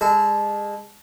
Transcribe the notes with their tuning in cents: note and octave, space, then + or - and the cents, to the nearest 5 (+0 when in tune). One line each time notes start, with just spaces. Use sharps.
G#3 -30 A4 -25